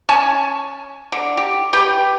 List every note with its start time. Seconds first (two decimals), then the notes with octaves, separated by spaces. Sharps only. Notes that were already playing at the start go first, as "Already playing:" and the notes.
0.09 C#4 G#5 A5
1.12 D3
1.37 G4
1.73 G4 B4 G5